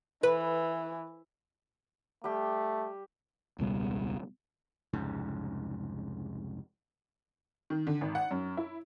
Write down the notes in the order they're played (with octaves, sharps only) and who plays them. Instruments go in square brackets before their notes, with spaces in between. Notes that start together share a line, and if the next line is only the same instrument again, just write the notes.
[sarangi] E3 [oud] B4
[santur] G3 G4 [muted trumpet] A3
[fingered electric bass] E1 C#2 B2 G3
[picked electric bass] C2 F2 G#2 C#3
[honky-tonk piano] D#3
D3
G#1
F#5
F#2
E4